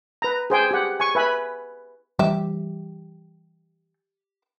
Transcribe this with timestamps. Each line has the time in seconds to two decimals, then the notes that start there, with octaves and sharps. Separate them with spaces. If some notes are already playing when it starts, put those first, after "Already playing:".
0.22 B4 A#5
0.50 G#4 C5 G5 G#5
0.71 G4 F#5
1.00 G#5 C#6
1.15 B4 E5 G#5 B5
2.19 E3 G3 G4 E5